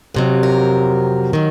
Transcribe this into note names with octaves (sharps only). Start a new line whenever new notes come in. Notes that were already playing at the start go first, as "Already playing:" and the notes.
F2 C3 F#3
A#4
D#3 F#3